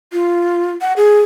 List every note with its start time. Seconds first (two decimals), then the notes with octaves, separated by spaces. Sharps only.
0.13 F4
0.81 F#5
0.97 G#4